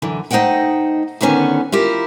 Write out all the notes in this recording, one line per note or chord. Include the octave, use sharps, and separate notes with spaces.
F#2 D3 E3
A3 D#4 C5 D#5 F#5 G5
D2 D3 D#3 B3 C#4 G#5
E4 F4 G4 A#4